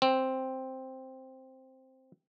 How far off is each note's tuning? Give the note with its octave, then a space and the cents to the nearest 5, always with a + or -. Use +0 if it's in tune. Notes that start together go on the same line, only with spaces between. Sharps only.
C4 +0